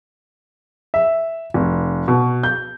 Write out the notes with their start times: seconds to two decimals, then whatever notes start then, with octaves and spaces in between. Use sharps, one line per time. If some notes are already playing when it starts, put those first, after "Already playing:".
0.94 E5
1.54 F1
2.08 B2
2.43 G6